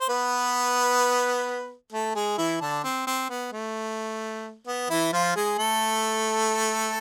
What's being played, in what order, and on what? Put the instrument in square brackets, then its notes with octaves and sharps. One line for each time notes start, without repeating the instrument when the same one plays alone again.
[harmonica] C5
B3 B4
A3 A4
G#3 G#4
E3 E4
D3 D4
C4
C4
B3
A3
B3
E3 E4
F3 F4
G#3 G#4
A3 A4